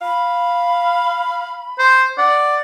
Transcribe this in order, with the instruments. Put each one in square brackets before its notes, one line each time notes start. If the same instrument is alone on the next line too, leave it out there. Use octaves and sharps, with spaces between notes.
[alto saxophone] F5 [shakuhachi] B5
[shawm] C5
[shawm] D5 [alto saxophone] F#5